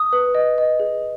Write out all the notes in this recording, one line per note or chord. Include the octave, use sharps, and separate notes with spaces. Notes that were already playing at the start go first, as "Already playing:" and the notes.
Already playing: D#6
B4
D#5
D#5
G#4